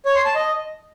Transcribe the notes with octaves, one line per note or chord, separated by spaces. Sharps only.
C#5
C6
A5
D#5